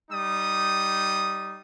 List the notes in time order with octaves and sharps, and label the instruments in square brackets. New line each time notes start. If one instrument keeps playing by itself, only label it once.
[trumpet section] G3 D#4 D#6